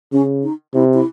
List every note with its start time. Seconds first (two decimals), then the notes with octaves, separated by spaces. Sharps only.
0.12 C#3 C#4
0.43 D#4
0.74 C3 E4
0.94 E4